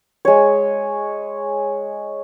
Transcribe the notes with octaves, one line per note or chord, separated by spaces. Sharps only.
G#3 C#5